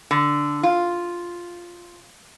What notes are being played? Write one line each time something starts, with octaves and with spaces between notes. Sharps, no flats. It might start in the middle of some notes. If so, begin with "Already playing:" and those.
D3
F4